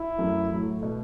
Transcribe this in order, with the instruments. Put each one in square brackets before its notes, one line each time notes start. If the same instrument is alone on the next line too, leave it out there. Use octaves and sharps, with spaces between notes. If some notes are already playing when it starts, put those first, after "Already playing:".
Already playing: [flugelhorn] E4
[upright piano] F#2 F#3 A3
A2 F#3 A3
B2 A3